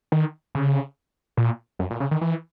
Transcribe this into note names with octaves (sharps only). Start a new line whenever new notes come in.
D#3
C#3
A#2
F#2
A#2
C#3
D#3
E3